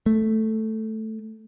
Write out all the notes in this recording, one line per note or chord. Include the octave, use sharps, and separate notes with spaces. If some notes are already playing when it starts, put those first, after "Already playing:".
A3